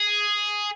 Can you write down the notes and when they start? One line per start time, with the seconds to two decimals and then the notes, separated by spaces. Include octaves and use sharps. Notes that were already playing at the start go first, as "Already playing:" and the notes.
Already playing: G#4